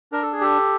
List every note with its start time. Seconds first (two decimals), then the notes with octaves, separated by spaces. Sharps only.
0.12 D4 A#4
0.22 A4
0.33 G#4
0.41 G4 A4